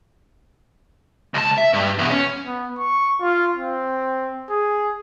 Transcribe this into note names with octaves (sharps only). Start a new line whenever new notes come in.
C#2 A5
E5
G2
E2 B2
C#4
B3
C#6
F4
C4
G#4